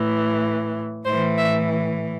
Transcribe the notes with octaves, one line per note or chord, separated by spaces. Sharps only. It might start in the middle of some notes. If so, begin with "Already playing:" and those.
Already playing: A2 E3
A2 E3 C5
E5